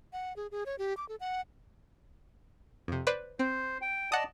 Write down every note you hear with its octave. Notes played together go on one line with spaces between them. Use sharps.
F#5
G#4
G#4
C#5
G4
D6
A4
F#5
F2 C3
B4 C5 D5
C4 C5
G5
D5 D#5 F#5 A5 D#6